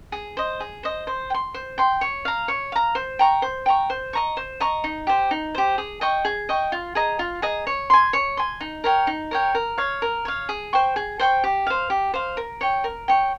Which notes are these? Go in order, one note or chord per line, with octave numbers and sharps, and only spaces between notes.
G#4
C5 D#5
G#4
C5 D#5
C5
G5
C6
C5
G5 C6
C#5
F5 A#5
C#5
F5 A#5
C5
G5 A#5 C#6
C5
G5 A#5 C#6
C5
D#5 A#5 C#6
C5
D#5 A#5 C#6
D#4
G4 C5
D#4
G4 C5
G#4
D#5 G5 C#6
G#4
D#5 G5 C#6
F4
G#4 D#5 A#5
F4
G#4 D#5 A#5
C#5
G#5 C6
C#5
G#5 C6
D#4
A#4 C#5 G5
D#4
A#4 C#5 G5
A#4
C#5 F5
A#4
C#5 F5
G#4
C5 G5 C#6
G#4
C5 G5 C#6
G4
C5 F5
G4
C5 F5
A#4
C#5 G5
A#4
C#5 G5